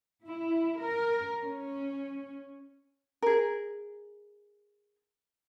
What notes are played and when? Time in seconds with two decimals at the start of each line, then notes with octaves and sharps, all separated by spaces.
0.24 E4
0.80 A#4
1.42 C#4
3.22 G#4 A#4